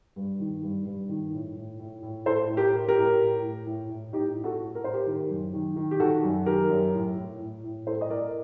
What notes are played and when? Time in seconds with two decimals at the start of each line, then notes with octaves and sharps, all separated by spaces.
0.16 G2
0.40 D#3
0.63 G2
0.86 G2
1.09 D#3
1.33 A2
1.56 A2
1.79 A2
2.03 A2
2.26 A2 A4 C5
2.49 A2
2.57 G4 A#4
2.73 A2
2.88 G4 A#4
2.96 A2
3.19 A2
3.43 A2
3.66 A2
3.89 A2
4.13 A2 D#4 G4
4.36 A2
4.44 F#4 A4
4.60 A2
4.75 A#4
4.83 A2 C5
4.93 G4 A#4
5.06 D#3
5.30 F#2
5.54 D#3
5.76 D#3
5.91 G4
6.00 D#3 F#4 A4
6.24 F#2
6.46 D#3 G4 A#4
6.70 F#2
6.94 A2
7.17 A2
7.40 A2
7.64 A2
7.86 A2 A4 C5
8.01 D#5
8.10 A2 A#4 D5